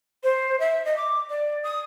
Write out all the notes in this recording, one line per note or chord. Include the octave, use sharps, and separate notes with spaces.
C5
E5
D#5
D6
D5
D#6